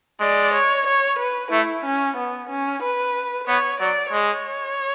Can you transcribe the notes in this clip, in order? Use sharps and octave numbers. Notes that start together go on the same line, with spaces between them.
G#3 D5
C#5
C#5
B4
A3 E4
C#4
B3
C#4
B4
B3 C#5
F#3 D5
G#3 C#5